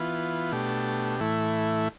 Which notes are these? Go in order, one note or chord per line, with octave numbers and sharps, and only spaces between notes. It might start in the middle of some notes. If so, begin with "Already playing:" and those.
Already playing: E3 B3 F4
B2 A3 D4 G4
A2 E3 A3 E4